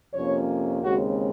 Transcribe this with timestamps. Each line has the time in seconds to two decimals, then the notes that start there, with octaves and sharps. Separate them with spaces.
0.13 F2 C3 F3 A#3 C#4 C#5
0.82 D#2 C#3 G#3 C4 F#4